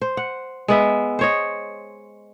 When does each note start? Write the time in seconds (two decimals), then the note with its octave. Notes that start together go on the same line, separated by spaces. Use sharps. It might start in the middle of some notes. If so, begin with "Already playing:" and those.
0.01 C5
0.17 F#5
0.68 G#3 B3 E5
1.19 C5 C#5 D#5